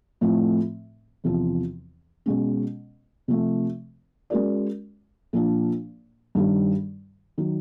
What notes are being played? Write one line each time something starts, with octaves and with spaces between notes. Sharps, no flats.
A2 F3 A3 C4
E2 C3 F3
B2 G#3 C#4
C3 F3 A3
G#3 C#4 F#4 A#4 D5
A#2 F3 A#3 D4
G2 D#3 G3
D#3 F#3